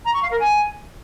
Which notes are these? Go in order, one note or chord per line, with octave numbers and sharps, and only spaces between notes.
A#5
C#6
F5
A#4
G#5